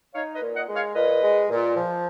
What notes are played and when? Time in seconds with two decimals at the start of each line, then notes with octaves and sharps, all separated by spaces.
0.15 D#4 C#5 F5
0.35 B4 D#5
0.42 A#2
0.56 D#5 F#5
0.69 G#3
0.75 C#5 F5
0.95 A#2 B4 D#5
1.22 G#3
1.50 A#2
1.76 F3